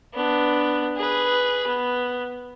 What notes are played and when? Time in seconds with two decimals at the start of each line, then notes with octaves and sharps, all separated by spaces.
0.14 B3 D4
0.96 G#4 B4
1.67 B3